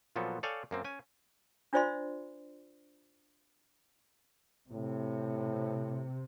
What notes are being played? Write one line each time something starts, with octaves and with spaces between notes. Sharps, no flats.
A#2 F3 F#3 B3 A4
A4 C#5 D5 F5 G5 G#5
F#2 A#3 C4
C#4 G#5
D4 F4 C5 D5 E5 C6
A2 C3